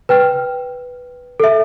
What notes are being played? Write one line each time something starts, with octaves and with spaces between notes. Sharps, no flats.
B4 G5 F6
A4 E5